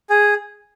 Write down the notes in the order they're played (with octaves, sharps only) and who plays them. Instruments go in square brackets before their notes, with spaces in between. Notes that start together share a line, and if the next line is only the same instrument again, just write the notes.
[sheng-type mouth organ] G#4